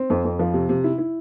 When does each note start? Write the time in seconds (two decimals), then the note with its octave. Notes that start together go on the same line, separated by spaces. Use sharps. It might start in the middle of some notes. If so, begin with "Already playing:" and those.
Already playing: C4
0.10 F2
0.25 F2
0.39 F3
0.54 C3
0.69 C3
0.84 E4
0.98 E4